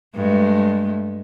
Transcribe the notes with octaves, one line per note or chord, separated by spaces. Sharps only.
G2 G#3 A3